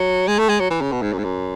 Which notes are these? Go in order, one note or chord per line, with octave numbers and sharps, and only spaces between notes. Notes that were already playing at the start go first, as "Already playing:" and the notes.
Already playing: F#3
G#3
A3
G#3
F#3
E3
C#3
B2
G#2
F#2
G#2
F#2